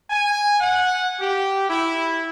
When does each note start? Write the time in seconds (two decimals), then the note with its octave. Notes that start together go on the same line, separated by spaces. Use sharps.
0.11 G#5
0.60 F#5
1.20 G4
1.70 E4